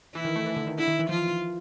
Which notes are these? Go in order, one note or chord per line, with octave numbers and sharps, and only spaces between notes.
E3 E4
D#3
A3
E3
D3
D#3
D3 E4
D#3
E3
F3 F4